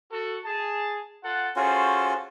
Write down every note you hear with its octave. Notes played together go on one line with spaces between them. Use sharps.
F#4 A4
G#4 A5
F4 A4 F#5
C#4 F4 F#4 G#4 A4 C5